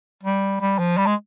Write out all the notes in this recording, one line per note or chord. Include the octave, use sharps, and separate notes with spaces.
G3
G3
F3
G3
G#3